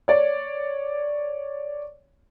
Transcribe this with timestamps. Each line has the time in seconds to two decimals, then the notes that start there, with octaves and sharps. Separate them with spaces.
0.08 C#5 D5